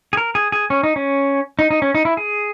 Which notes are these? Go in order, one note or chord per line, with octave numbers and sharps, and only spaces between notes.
G#4
A#4
G#4
G#4
C#4
D#4
C#4
D#4
D#4
C#4
D#4
E4
G#4